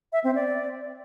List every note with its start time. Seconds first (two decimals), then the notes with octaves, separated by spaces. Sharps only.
0.13 E5
0.24 C4
0.35 D5